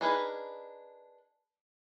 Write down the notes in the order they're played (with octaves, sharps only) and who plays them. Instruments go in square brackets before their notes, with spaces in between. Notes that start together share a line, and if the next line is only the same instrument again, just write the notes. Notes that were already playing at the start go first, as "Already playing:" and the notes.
[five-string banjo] D4 D#4 G#4 A#4 B4